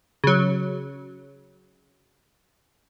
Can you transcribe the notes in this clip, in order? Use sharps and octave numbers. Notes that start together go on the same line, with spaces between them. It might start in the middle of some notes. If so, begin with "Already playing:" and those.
C#3 F#3